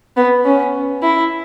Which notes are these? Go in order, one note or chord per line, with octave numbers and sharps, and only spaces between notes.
B3
C#4
E4